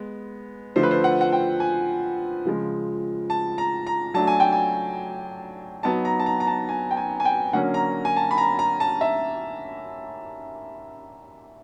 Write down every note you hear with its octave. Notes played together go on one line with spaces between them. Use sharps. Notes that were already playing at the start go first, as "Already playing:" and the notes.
Already playing: G#3 B3
D3 F3 A3 C5
B4
C5
F#5
F#5
G5
G#5
C#3 F3 G#3
A5
A#5
A#5
F#3 A3 D4 A5
G#5
G5
G#5
F#3 B3 D#4 A5
A#5
A5
A#5
A#5
A5
G#5
G5
G#5
G#5
G5
D3 F#3 A#3 C#4 F#5
A#5
G#5
A5
B5
A#5
A#5
A5
E5